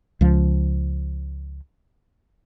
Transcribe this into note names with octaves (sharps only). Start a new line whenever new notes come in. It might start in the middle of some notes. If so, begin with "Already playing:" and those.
C#2 F3